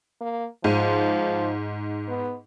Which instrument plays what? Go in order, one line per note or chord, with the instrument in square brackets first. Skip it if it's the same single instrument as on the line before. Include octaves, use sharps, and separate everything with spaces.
[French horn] A#3
[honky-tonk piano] G#2 D#7 [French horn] F3
[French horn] B3